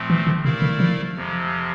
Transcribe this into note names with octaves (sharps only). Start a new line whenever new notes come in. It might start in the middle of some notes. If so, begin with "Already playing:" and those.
Already playing: A#2 F3 A3 C4
E3
D3
C3 A3 E4 A#4 D5 F5
D3
F3
F2 C3 F3